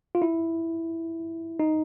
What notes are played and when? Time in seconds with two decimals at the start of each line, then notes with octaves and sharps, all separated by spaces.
0.15 F4
0.22 E4
1.60 D#4